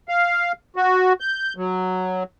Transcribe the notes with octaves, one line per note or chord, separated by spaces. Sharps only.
F5
F#4
G6
F#3